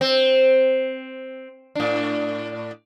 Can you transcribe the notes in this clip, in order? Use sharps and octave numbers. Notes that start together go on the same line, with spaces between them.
C4
A2 D4